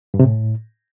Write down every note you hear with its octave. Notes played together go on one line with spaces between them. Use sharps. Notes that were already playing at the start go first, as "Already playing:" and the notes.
G2
C3
A2